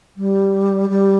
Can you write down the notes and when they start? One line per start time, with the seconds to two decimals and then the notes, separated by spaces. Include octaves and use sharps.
0.16 G3
0.89 G3